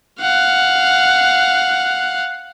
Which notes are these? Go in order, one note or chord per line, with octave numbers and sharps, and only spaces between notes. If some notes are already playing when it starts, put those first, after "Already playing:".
F5 F#5